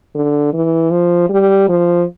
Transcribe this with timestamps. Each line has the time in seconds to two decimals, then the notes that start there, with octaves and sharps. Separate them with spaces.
0.15 D3
0.53 E3
0.91 F3
1.29 G3
1.69 F3